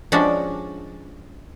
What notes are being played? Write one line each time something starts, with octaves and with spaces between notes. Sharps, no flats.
F3 G#3 C#4 D4 F#4 G4